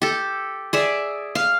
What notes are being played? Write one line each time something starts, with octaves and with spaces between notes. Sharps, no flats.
G4 A4
G#4 D5 E5
F5